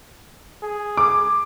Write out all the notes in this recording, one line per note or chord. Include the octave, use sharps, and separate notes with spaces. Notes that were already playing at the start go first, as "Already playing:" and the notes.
G#4
D6